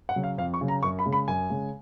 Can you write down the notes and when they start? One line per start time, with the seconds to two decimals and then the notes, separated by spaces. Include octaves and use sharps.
0.09 F#5
0.16 C#3 F#3
0.23 F5
0.38 F2 F5
0.54 C#6
0.61 C#3 F#3
0.68 A#5
0.83 F#2 C#6
0.99 B5
1.06 C#3 G#3
1.13 B5
1.28 F#2 G#5
1.50 C#3 G#3